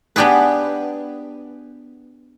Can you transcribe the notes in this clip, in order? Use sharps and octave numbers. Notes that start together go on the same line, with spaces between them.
B3 D4 G4 G#4 B4